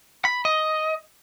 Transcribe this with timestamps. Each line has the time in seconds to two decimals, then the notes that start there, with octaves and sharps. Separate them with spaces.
0.25 B5
0.45 D#5